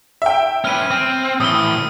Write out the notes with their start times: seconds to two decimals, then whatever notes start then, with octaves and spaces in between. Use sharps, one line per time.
0.22 E5 G5
0.65 C#4 B4 F6 D#7
0.91 C4
1.40 A2 E3 D#6 E6 G7